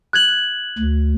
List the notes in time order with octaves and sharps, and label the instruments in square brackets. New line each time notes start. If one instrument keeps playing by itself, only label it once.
[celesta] F#6 G#6 F#7
[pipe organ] D2